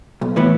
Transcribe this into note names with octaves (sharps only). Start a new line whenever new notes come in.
B1
A2 E3 B3